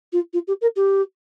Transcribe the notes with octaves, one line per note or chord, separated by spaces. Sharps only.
F4
F4
G4
A#4
G4